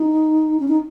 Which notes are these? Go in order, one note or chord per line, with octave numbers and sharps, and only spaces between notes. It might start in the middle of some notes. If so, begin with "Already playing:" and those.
Already playing: D#4
C#4
D#4